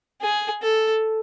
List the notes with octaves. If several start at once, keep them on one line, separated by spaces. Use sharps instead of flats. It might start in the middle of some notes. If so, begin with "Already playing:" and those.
G#4
A4